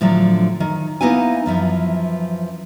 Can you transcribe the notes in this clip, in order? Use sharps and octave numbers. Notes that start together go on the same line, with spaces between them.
A2 D3 F3 F#3
D#3
A#3 B3 D#4 E4 G#5
F#2 E3 F3